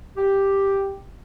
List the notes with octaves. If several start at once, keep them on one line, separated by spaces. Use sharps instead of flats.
G4